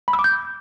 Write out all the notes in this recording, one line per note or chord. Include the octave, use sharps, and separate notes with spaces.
B5
E6
D6
G6